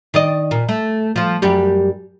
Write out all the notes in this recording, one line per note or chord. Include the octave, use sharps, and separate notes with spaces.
D#3 D5 D#5
A#2
A3
F3 F4
F#2 G3 G4